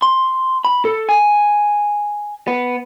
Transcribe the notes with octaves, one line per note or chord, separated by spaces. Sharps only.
C6
B5
A4
G#5
B3